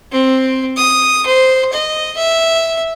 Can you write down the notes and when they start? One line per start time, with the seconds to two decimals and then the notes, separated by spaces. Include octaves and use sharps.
0.12 C4
0.77 D#6
1.26 C5
1.73 D#5
2.17 E5